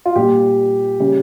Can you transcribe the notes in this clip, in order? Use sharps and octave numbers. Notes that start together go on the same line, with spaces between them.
F4
A#2 G3 G4
C#3 G3